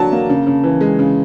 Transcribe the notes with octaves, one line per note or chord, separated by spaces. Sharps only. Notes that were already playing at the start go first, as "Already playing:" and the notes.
Already playing: D3 F#3 A#3 D4 A5
A#3
C#3
C#3
E3
G#3
C#3